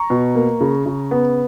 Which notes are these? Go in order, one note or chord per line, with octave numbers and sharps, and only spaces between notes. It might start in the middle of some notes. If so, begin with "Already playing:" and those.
Already playing: A#5 C#6
B2
A#3
C#3
C#3
B3